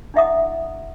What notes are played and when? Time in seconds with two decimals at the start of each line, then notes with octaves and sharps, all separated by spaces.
0.14 D4 E4 D#5 E5 F#5 D#6